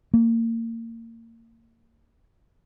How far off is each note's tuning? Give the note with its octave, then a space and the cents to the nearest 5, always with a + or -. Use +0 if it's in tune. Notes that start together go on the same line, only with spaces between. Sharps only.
A#3 -30